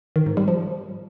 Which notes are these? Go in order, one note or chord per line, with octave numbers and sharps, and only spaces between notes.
D#3
G#2
G3
F3